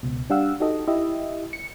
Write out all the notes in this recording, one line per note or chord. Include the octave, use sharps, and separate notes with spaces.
C#2 B2
G3 D4 G4 F5 F#5 E6
D#4 F#4 G4 A4 D#5
E4 G4 D#5 E5
C#7